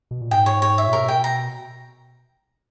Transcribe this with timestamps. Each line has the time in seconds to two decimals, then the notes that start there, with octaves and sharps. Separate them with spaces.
0.11 B2
0.21 A#2
0.31 G#2 G5
0.46 C#5
0.62 C#5
0.78 E5
0.87 A#2
0.93 B2 A#4
1.08 G5
1.24 A#5